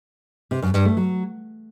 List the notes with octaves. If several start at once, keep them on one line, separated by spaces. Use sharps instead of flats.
C3
F#2
G2
A3
F#3